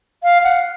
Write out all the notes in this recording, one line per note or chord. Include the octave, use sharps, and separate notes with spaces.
F5
F#5